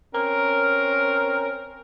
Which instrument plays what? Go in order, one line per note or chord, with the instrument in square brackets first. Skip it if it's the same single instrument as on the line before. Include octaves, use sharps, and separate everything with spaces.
[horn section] C4 C#4 A#4